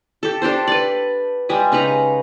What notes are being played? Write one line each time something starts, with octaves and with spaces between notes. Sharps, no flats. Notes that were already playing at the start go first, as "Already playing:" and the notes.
G4 A4
D4 G4 A4 C5
B4 D5
G3 G#3 G4 G#4
C#3 D#4 B4 A#5